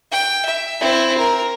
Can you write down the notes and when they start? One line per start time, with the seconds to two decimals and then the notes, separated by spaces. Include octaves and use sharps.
0.12 G5
0.45 E5
0.81 C4 E4
1.18 A#4